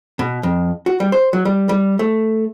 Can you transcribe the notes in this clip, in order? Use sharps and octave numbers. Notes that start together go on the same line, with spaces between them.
B2
F2
F#4
G3
C5
F#3
G3
G3
A3